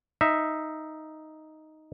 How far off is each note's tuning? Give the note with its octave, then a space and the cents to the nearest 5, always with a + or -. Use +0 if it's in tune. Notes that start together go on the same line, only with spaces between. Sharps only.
D#4 +0 E5 +0